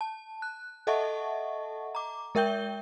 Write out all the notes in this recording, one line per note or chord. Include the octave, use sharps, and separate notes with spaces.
A5
F#6
A4 D#5 E5 F#5 A5 C#6
A#5 D6
G#3 A#4 E5 G5 G6 G7